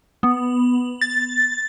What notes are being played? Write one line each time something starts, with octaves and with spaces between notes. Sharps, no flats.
B3
A6